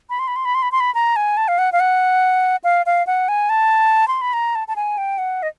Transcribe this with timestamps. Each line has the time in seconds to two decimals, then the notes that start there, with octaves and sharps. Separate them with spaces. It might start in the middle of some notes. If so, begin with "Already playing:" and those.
0.10 B5
0.19 C6
0.28 B5
0.36 C6
0.45 B5
0.55 C6
0.62 B5
0.72 C6
0.80 B5
0.95 A#5
1.16 G#5
1.37 A5
1.48 F5
1.58 F#5
1.72 F5
1.80 F#5
2.64 F5
2.86 F5
3.07 F#5
3.28 G#5
3.50 A5
4.08 C6
4.21 B5
4.33 A#5
4.55 A5
4.68 A5
4.76 G#5
4.98 G5
5.18 F#5
5.43 D#5